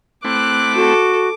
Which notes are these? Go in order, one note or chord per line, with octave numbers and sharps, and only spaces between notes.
A3 C4 E4 D6 F#6
F#4 A4